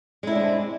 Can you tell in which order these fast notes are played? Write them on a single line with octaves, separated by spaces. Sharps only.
G#3 E4 G3 D4 C4